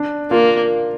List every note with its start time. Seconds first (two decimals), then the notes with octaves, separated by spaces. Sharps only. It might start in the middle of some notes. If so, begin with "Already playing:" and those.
Already playing: D4
0.31 A#3 F4